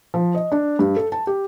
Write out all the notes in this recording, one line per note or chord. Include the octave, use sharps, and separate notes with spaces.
F3
D#5
D4
G2
A4
A5
G4